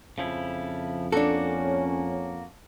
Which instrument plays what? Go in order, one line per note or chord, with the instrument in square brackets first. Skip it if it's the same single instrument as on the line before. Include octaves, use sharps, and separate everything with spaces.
[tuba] F2 [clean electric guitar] C#3 F3 E4
[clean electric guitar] A#3 F#4 [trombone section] C#4 [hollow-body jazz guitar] D4 A4